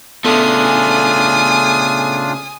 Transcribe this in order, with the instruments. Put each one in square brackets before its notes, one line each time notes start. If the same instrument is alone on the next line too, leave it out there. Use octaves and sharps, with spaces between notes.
[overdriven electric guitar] C#3 A3 [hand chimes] B3 A4 [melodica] D4 F4 [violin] G#5 D#6